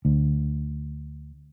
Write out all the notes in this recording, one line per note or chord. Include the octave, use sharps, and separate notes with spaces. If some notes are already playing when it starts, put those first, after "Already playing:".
D2